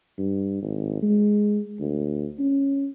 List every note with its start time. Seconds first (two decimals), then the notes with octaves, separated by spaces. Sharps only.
0.18 G2
0.62 G#1
1.02 G#3
1.80 D2
2.39 C#4